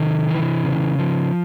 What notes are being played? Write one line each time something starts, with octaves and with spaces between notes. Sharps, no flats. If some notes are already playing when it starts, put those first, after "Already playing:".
Already playing: C3 D#3
E3
C#3
F3